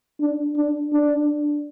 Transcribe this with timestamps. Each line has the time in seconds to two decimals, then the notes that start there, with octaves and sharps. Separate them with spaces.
0.21 D4
0.57 D4
0.93 D4